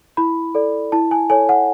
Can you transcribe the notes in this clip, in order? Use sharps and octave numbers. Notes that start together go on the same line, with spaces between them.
E4 B5
A4 D5
E4 A5
G#5
A4 C#5 G#5
F#5